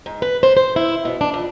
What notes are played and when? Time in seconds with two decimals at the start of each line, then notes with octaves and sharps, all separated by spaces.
0.06 G#2
0.22 B4
0.43 C5
0.57 C5
0.76 E4
1.05 B2
1.21 D4
1.34 F2